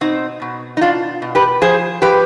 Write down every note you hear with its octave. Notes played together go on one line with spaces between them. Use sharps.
B2 C4 D#4
B2
D#4
B2 D4 F4
B2
G4 B4
F3 G#4 C5
F3 G4 B4